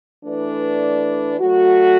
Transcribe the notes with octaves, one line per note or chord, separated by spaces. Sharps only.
E3 A3 D4 B4 D5
F#3 A3 F#4